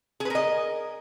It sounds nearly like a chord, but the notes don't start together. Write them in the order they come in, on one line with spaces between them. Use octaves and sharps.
G#4 B4 A#4 D#5